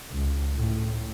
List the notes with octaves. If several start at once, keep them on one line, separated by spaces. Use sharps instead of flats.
C#2
A2